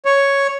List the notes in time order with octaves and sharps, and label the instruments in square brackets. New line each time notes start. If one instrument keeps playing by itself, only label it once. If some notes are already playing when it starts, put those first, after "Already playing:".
[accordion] C#5